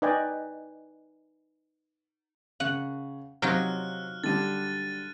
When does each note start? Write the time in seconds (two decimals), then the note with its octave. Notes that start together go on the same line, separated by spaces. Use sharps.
0.02 D#4 B4 D5 D#5 G5 G#5
2.60 C#3 F#5
3.42 C3 F#3 C4 D#4 F4 F6 F#6
4.24 D3 G3 D4 A6 D#7